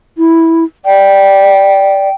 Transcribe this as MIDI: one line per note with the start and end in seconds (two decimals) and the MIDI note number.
0.17 0.64 64
0.85 2.08 74
0.85 2.13 79